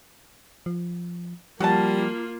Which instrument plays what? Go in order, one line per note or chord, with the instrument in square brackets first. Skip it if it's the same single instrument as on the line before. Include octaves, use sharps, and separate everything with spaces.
[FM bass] F3
[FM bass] F3 [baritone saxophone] G3 [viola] A#3 F4 [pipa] F#4 A5